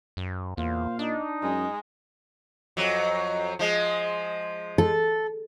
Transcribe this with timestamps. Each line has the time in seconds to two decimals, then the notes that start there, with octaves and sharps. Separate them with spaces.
0.17 F#2
0.57 E2 A#2 C5 F5
0.99 D4 D#4
1.43 F#2 G#3
2.77 F2 F#3
3.59 F3 G#3
4.78 A4